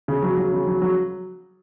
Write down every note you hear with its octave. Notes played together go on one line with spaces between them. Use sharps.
C#3
F#3
F#3
C#3
F#3
F#3